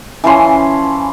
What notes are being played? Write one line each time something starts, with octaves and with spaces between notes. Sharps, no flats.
E3 F3 C#4 C6